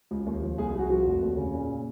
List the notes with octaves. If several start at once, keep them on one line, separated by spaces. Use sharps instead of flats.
C#2
D#2
F3
C2 G#4
G#4
C2
F#4
F3 F#4
F1
D#2
C#3
A#2